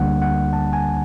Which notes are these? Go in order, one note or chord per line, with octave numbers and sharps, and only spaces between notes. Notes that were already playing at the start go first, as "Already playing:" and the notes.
Already playing: D2 D3 G3 A#3 D4 F#5
F#5
A5
G#5